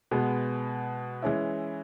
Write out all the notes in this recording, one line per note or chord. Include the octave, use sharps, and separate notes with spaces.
B2 G#3 B3
E3 G#3 C#4 E4